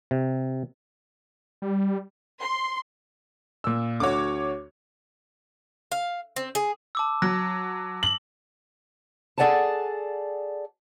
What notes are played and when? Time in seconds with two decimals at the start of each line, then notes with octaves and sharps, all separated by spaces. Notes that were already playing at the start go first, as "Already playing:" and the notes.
0.11 C3
1.62 G3
2.39 C6
3.64 A#2 E6
4.00 D2 F#4 C#5 D6
5.92 F5
6.36 C4
6.55 G#4
6.95 A5 D6 E6
7.22 F#3 A#6
8.03 F#7
9.38 G#4 A4 D5 F#5 G#5 A5